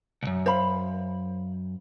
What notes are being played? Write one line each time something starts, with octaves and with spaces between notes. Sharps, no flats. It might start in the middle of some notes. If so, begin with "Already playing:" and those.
C2 F#2
C5 F5 B5